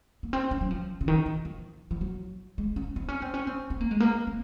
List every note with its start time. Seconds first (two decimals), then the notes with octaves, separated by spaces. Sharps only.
0.23 A#3
0.33 C4
0.51 C#4
0.61 F#3
0.71 F3
1.01 C#3
1.08 D#3
1.26 D#3
1.45 F3
1.91 F3
2.01 F#3
2.58 G#3
2.76 C#4
2.96 C4
3.08 C#4
3.22 C4
3.34 C#4
3.47 C4
3.70 C4
3.81 A#3
3.91 G#3
4.00 A#3
4.27 C4